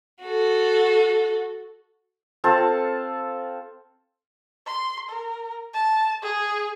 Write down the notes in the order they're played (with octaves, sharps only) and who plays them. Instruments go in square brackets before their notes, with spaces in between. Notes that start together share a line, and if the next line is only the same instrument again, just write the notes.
[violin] F#4 A4
[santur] C4 F4 A4 A5
[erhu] C6
A#4
A5
G#4